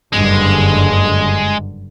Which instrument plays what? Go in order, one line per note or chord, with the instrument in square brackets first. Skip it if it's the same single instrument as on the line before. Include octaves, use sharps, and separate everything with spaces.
[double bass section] F#1 G2 D3 [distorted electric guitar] G#3